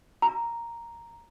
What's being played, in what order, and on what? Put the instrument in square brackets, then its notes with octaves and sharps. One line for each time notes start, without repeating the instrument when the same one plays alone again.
[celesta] A#5